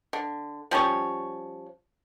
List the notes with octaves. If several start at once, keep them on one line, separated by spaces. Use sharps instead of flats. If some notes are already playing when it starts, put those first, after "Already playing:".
D3
F3 G3 C#4 C#5